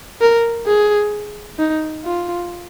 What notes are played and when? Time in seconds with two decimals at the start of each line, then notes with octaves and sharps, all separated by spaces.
0.21 A#4
0.67 G#4
1.59 D#4
2.05 F4